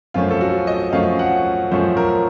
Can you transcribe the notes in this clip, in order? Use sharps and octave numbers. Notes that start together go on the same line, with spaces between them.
F#2 F3 A3 C#4 F4
A4
F#4
D#5
F#2 F3 A3 C#4 F5
F#5
F#2 F3 A3 C#4 C5
A#4